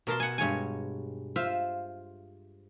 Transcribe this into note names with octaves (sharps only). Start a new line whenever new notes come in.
B2 A#4 A5 C6
F#5 G#5
G2 G#3 C#5 G#5
F4 C5 E5 F5